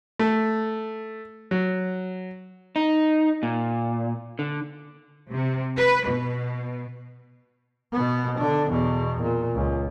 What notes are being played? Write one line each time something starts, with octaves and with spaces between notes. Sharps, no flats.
A3
F#3
D#4
A#2
D3
C3
B4
B2
B2 B3
D3 D4
E2 B2
A#2
C#2